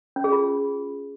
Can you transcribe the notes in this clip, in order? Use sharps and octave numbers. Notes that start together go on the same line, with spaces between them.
C#4
G#4
F4